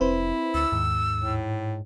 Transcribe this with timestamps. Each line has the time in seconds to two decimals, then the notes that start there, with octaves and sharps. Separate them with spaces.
0.01 F1 C4 E4 B4 C5
0.54 D2 E6
0.72 D#2 G#2
1.21 A2